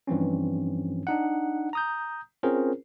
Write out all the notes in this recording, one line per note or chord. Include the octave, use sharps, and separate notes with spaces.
G2 E3 F3 C4 C#4
D4 D#4 F#5
A#5 D#6 G6
C4 C#4 F4 G#4 A#4 C5